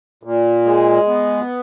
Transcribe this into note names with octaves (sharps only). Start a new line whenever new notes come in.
A#2
G#3
B3